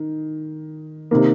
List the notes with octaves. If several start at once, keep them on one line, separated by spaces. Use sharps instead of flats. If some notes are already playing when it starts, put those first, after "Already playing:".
Already playing: D#3
C3 D#3 A#3